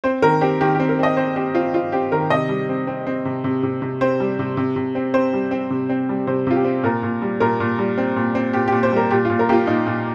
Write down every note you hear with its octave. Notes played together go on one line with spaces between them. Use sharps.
C4 C5
D#3 A#4
C4 G4
D#3 G4
G4
C4
A#4
C4 D#5
C4 C5
C4 G4
C4 F4
C4 F4
C4 G4
D#3 A#4
C3 D#5
G3
C4
C4
C4
C3
C3
C3
C3
C4 C5
G3
C3
C3
C3
C4
C4 C5
G3
C4
C3
C4
G3
C3 C5
C3 F4
G4
C4
A#2 A#4
A#2
G3
A#2 A#4
A#2
G3
C4
A#2
C4
A#2 G4
G4
A#2
C5
G3 A#4
A#2 G4
F4
A#2
A#4
A#3 F4 G4
A#2 D#4
A#2